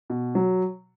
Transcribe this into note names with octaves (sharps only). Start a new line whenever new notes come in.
B2
F#3